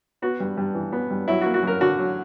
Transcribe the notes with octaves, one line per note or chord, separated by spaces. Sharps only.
B3 F#4
G2
G2
E3
B3
G2
F#3 E4
F#4
A#3
F#4
F#2 A#4
D3 F#4
F#3